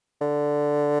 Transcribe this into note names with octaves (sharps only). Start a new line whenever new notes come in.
D3